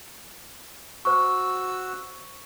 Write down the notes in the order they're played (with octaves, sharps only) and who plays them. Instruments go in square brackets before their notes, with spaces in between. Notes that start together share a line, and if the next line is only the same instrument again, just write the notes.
[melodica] F#4 E6 [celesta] C5 C#6